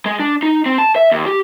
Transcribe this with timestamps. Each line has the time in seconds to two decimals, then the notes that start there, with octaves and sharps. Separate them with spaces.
0.06 G#3
0.20 D4
0.43 D#4
0.66 C4
0.78 A5
0.96 E5
1.12 D#2
1.26 G4